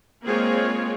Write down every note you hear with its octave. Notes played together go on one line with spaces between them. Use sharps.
G#3 A#3 C4 F4 G#4 C#5